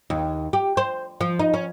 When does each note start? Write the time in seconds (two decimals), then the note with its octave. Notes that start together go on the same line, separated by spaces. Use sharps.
0.10 D#2
0.53 G4
0.77 C5
1.21 F3
1.39 D#4
1.54 C#4